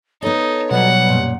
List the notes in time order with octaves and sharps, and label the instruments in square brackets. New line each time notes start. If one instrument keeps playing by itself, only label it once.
[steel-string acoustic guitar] B3 A4 [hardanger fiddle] D#4 [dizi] C#5
[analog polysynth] B2 F#3 G3 [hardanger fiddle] F#5
[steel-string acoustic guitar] F#2 A#2